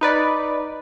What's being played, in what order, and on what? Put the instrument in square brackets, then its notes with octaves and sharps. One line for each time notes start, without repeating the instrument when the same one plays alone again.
[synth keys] D#4 B4 D5